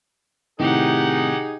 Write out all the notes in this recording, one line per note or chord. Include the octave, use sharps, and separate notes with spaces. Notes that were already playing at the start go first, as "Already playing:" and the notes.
A2 C3 D#3 D#4 G4 G#4 F#5